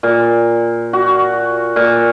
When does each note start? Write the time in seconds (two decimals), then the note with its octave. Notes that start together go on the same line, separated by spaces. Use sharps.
0.03 A#2
0.93 F#4
1.76 A#2